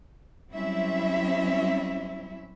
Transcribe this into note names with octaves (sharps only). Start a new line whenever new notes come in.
F#3 G3 C4 C#4 E4 E5